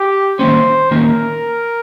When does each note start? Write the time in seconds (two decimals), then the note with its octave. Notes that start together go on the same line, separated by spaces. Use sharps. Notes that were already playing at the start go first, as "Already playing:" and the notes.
Already playing: G4
0.39 D#3 A#3 C#4 C5
0.91 D#3 A#3 C#4 A#4